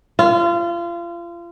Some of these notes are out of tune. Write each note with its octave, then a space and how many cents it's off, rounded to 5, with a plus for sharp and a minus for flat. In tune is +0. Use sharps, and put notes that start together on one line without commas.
F4 -30